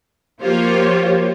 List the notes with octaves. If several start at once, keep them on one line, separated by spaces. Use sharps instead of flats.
F3 A#3 F4 G4 C5 C#5